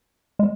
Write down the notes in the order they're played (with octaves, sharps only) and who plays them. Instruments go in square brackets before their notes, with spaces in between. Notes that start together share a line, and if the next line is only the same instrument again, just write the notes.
[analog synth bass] G#3